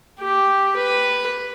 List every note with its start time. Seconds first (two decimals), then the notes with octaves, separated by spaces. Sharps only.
0.21 G4
0.77 B4